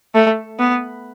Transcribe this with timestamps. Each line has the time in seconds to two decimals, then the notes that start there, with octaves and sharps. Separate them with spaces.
0.15 A3
0.59 B3